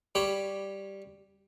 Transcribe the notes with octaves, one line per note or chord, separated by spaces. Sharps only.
G3 C#5 G5 B5 D6